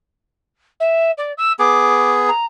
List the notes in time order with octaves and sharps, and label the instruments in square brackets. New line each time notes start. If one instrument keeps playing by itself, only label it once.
[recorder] E5
D5
E6
[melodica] B3 G#4 [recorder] D6
[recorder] A#5